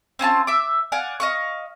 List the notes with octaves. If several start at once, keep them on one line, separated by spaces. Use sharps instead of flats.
C4 C#4 F4 A5
E5 D6
D5 F5 F#5 G#5
D#5 F5 C#6